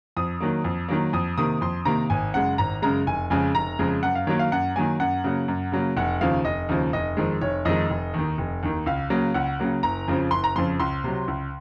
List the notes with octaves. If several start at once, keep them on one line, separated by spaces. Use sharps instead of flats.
F2 D#6
D#3 F#3 A#3
F2
D#3 F#3 A#3
F2 D#6
C3 D#3 A#3 D#6
F2 C6
C3 D#3 A#3 A#5
G#1 G#5
F#2 C#3 G#3 F#5
G#1 A#5
F#2 C#3 G#3 A#5
F1 G#5
F2 C#3 G#3 G#5
F1 A#5
F2 C#3 G#3
F#2 F#5
F5
D#3 F#3 A#3 C#5
F5
F#2 F#5
D#3 F#3 A#3 G#5
F#2 F#5
C#3 F#3 A#3
F#2
C#3 F#3 A#3
F1 F#5
D#2 C#3 F3 F5
F1 D#5
D#2 C#3 F3
F1 D#5
F2 D#3 G#3
F1 C#5
F2 D#3 G#3 D#5
F1
D#2 D#3
F1
D#2 D#3
C#2 F5
C#3 F#3 A#3
C#2 F#5
C#3 F#3 A#3
F#1 A#5
F2 C#3 F3
F#1 C6
A#5
F2 C#3 F3 C6
C#2 C6
C3 F#3
C#2